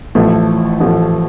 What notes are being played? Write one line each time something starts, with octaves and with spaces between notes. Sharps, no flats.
A1 A2 F3 A3
A1 A2 F3 A3